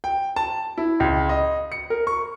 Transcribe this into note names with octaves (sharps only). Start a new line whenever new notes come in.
G5
A5
E4
C#2
D#5
C#7
A#4
C#6